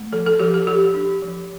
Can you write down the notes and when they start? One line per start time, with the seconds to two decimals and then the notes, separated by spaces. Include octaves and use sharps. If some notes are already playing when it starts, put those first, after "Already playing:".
Already playing: A3
0.12 F3 A4
0.27 A4
0.40 F3 G4
0.54 A4
0.67 F3 G4
0.94 D4
1.22 F3